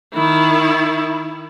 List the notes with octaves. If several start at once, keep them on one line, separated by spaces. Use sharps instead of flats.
D#3 E4